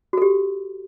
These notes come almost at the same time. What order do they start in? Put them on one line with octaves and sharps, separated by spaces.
F#4 A4 G4